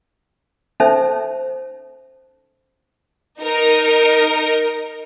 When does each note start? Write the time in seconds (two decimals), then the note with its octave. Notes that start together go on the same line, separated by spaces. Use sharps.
0.80 C#4 D#4 A4 C5 E5 A5
3.41 D#4 A#4